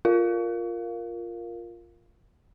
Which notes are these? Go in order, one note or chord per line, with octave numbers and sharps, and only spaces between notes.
F4 A#4 F5